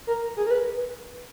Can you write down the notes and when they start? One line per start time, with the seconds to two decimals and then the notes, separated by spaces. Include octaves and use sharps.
0.07 A#4
0.37 G#4
0.47 A#4
0.51 B4